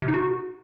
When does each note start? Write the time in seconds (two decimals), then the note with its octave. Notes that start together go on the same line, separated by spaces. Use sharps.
0.02 C3
0.08 D#4
0.14 F#4